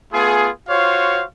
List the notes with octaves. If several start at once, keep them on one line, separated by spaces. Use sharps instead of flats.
A3 B3 F4 G#4
F4 F#4 C5 C#5 F5